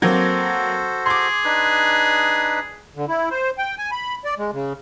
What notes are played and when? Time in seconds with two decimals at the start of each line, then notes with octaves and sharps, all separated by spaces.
0.02 F#3 A#3 C4 F#4 A4 C5
1.06 G#4 C6 D6
1.45 D4 D#4 B4
2.96 D3
3.08 E4
3.31 C5
3.58 G5
3.78 G#5
3.92 B5
4.25 D5
4.38 G#3
4.52 C#3